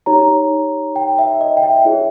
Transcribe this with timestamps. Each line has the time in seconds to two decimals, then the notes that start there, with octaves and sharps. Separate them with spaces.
0.06 D#4 G4 C#5 A#5
0.96 G5
1.19 E5
1.41 D#5
1.57 G5
1.63 E5
1.85 E4 G#4 C#5